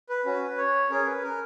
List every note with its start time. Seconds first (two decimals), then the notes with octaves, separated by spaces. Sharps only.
0.09 B4
0.25 C#4 F#4
0.57 C#5
0.90 C#4 G#4 A#4
1.06 B4
1.23 A#4